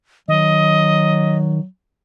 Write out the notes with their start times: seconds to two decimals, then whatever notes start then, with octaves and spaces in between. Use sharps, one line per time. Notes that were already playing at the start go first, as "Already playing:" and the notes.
0.28 D#3 F#3 D#5